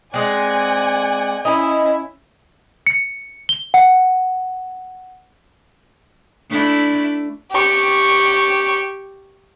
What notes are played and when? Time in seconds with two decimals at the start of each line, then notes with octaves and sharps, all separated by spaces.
0.14 G#3 C4 D5 F#5 G#5
1.45 C#4 E4 D#5
2.87 C#7
3.49 G7
3.74 F#5
6.50 A3 D4 E4
7.52 G4 C#6